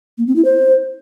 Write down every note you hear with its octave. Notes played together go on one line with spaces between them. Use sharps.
A#3
C4
E4
C5